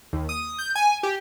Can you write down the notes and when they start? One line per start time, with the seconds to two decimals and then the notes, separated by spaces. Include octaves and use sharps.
0.13 D#2
0.29 D#6
0.59 G6
0.75 G#5
1.03 G4